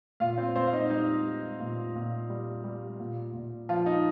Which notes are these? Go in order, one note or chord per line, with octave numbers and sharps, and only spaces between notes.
A#2 F4 F5
C4 C5
A#2 C4 C5
F5
D#4 D#5
G3 D#4
G3
A#2
A#2
G3
G3
A#2
A#2
F3 F4
D#4